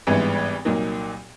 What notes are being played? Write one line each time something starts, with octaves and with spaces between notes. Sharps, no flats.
G#1 G2 E3 G#3 B3
C2 A#2 F#3 A#3 D#4